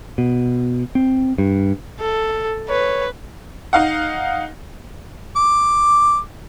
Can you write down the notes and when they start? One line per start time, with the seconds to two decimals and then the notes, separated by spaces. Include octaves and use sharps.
0.18 B2
0.95 C4
1.38 G2
2.00 A4
2.69 B4 C#5
3.73 D#4 F5 F#5
5.36 D6